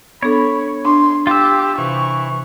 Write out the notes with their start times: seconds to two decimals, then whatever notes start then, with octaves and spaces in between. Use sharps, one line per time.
0.23 B3 D4 A4 C#5 B5
0.85 D4 C6
1.27 F4 G4 E6
1.78 C3 E3 C#6